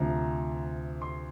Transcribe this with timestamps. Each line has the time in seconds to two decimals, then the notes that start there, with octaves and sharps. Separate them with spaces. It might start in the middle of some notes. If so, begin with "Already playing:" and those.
Already playing: D2 C3 F3 A#5
1.02 C6